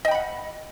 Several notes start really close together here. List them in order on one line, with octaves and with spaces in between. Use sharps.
D#5 G5 B5 F#5